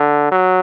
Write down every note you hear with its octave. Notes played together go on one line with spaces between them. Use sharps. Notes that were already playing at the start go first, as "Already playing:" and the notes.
Already playing: D3
F#3